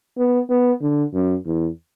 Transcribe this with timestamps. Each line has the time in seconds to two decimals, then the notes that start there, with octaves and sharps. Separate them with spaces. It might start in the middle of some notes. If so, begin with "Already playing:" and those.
0.18 B3
0.50 B3
0.82 D3
1.14 F#2
1.46 E2